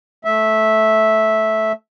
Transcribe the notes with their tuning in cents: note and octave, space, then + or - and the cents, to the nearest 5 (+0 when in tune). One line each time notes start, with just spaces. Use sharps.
A3 -10 E5 -10